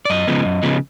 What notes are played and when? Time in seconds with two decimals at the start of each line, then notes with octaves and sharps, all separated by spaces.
0.05 D5
0.10 F#2 D#5
0.27 C#3 F3 G#3 B3
0.45 F#2
0.63 C#3 F3 G#3 B3